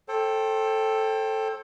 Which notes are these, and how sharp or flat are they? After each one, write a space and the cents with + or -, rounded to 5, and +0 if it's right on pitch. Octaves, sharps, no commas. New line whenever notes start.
A4 +0 C5 +35 G5 +0